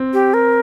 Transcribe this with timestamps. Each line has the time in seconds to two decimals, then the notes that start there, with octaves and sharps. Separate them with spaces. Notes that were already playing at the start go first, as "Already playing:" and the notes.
Already playing: C4
0.13 G4
0.34 A#4